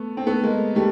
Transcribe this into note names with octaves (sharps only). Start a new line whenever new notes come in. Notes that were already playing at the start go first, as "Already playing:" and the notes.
Already playing: A3 B3
C4
A3 B3
G#3 A#3
G3 A3